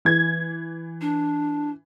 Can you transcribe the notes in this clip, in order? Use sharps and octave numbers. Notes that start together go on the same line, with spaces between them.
E3 G#6
D4